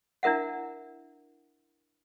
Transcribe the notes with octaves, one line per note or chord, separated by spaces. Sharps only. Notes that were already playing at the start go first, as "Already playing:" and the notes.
D4 E4 A#4 E5 F#5